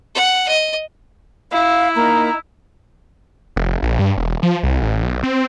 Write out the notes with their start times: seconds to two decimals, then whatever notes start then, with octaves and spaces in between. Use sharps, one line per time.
0.15 F#5
0.48 D#5
1.52 E4 F5
1.96 A#3 D#4 A#5
3.56 F1
3.82 A#1
3.99 G2
4.17 E1
4.43 F3
4.63 C2
4.82 A1
5.02 B1
5.23 C4